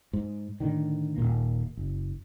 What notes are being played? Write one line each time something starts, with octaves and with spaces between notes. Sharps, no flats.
G#2
A2 D3 D#3
D#1 G#1 A#2 A#3
F#1